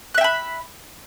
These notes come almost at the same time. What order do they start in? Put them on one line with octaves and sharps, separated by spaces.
F#6 E5 G5 B5